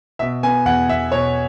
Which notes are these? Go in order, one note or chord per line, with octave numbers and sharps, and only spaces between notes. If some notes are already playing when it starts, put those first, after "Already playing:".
B2 E5
B3 G#5
E2 F#5
E2 E5
B2 C#5